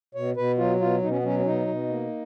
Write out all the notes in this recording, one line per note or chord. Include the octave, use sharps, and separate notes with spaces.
B2 C#5
B2 B4
F#3 F4
B2 F4
B2 D#4
C#4
B3
F#3 C#4
C#4
B2 D#4
B2
A#3